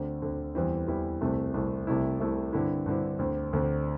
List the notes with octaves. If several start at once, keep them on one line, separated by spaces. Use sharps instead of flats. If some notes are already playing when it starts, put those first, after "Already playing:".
Already playing: D2 D3 C4
D2 D3 C4
E2 E3 G3 C4 E4
E2 E3 G3 C4 E4
C2 C3 A3 C4 E4
C2 C3 A3 C4 E4
C2 C3 A3 C4 E4
C2 C3 A3 C4 E4
G2 D3 C4 E4
G2 D3 C4 E4
D2 D3 C4
D2 D3 C4